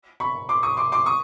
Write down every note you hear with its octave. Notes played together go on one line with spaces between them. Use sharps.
B5 C#6
C6 D6
C#6 D#6
C6 D6
C6 D6
C#6 D#6